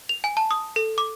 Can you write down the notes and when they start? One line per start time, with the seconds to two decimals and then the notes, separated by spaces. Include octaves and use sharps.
0.09 F7
0.24 G#5
0.37 A5
0.51 D#6
0.76 A4
0.98 D6